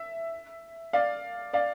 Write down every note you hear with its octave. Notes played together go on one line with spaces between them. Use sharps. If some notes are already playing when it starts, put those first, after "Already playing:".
Already playing: E5
D5 F5
D5 F5